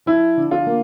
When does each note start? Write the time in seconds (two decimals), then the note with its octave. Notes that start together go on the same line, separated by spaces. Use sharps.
0.06 F3 E4
0.37 D3
0.51 F4
0.66 A#3